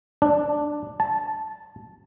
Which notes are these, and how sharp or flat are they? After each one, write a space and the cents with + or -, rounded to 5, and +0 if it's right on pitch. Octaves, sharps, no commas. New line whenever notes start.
D4 +5
A5 -10